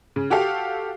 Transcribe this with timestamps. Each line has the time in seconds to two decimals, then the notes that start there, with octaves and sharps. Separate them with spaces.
0.16 C#3
0.30 F#4 G4 A4 F5